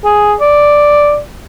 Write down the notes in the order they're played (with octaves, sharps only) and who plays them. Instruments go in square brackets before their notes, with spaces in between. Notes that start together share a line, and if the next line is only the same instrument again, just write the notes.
[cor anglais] G#4
D5